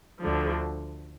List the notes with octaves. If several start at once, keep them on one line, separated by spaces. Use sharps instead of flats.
D2 D3 F3